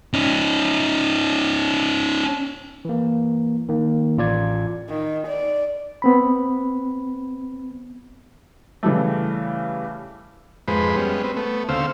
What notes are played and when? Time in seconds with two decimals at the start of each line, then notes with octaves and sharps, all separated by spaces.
0.14 C#4 D#4
2.85 E3 A#3
3.69 D#3 A#3
4.18 A1 F4 D5 G#6
4.89 D#3
5.27 D5
6.02 B3 C4 B5
8.83 C#3 E3 G3 A3
10.68 F2 G#2 G#3 B4 C5 B5
10.96 G3 G#3 B3 C#4
11.23 C4 B4
11.36 A3 B3
11.69 D2 C#3 C4 C5 F5 E6